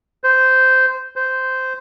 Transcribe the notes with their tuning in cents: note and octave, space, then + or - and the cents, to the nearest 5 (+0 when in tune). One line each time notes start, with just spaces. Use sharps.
C5 -10
C5 -10